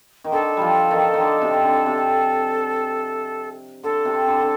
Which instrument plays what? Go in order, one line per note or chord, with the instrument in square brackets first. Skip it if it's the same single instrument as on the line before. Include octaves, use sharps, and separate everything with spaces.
[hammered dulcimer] D#3
[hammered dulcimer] D3 [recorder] A4
[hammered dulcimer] F3 G3
D#3
D#3
D3
C3
D3
C3
[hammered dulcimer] D3 [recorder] A4
[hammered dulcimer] C3
D3
D3